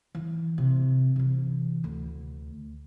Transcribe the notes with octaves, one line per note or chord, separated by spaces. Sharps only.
E3
C3
C3 E3
D2